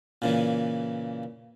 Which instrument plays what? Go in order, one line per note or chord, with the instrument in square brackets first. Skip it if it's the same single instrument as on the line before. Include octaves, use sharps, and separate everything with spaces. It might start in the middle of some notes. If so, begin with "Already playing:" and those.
[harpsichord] A#2 C#3 E3